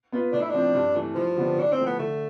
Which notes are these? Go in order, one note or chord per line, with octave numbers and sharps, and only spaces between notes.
B3 F4 B4
A2 D4
E4
F3 C4 D4
G2
E3 A3
G2 F3
D3 G3 B3 D4
A2 D4
C4
F3 A3
B3
D3 A3